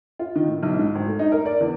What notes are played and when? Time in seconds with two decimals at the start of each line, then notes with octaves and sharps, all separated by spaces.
0.19 F4
0.36 D#3
0.48 A2
0.63 B1
0.79 G#2
0.95 G#1
1.07 A3
1.19 D#4
1.32 A#4
1.45 D5
1.61 E2